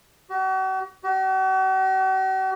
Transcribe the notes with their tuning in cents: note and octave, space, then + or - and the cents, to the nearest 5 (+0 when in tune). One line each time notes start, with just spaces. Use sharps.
F#4 +40
F#4 +45